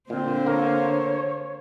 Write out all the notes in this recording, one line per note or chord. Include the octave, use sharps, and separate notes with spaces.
A#2 D3 C4 C5
A#3 A#4 C#5